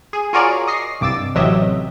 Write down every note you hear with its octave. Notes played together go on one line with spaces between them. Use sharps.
G#4
F4 F#4 G#4 A#4 C#5 D5
D#5 C#6 A#6 C7
C2 G2 D6 E6 A6
A1 C3 F#3 G4 D#5 E5